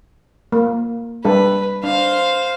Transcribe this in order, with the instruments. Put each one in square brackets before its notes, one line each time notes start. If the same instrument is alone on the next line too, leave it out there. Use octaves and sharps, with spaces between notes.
[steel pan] A#3
[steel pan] G3 D4 A4 [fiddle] B4
[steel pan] D4 [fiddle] C5 F5